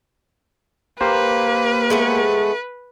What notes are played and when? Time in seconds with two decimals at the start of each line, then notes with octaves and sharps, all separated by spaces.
1.01 A#3 G4 B4 C5
1.90 G#3 A3 B3